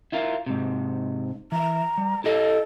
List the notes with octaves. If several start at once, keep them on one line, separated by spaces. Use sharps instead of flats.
E4 F4 A#4
G#2 C3
E3 E5 A#5
G3
E4 G4 A4 D#5